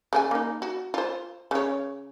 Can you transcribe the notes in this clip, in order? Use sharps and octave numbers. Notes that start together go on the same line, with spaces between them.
C#3 C#4 G#5
A#3 D#4
F#4
F4 C5
C#3 C#5